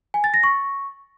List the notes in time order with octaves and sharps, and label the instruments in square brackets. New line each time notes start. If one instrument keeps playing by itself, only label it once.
[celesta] G#5
A6
A#6
C#6